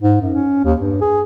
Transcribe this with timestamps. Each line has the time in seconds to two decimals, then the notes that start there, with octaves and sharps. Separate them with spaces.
0.02 G#2
0.21 F#2
0.34 C#4
0.65 D#2
0.80 G2
1.01 G#4